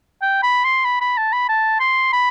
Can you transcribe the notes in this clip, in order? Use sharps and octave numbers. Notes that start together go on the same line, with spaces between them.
G5
B5
C6
B5
B5
A5
B5
A5
C6
B5